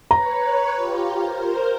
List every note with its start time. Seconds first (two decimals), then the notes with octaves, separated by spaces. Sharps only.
0.11 B4 C#5 A#5
0.74 F4 G4
1.13 A#4 C5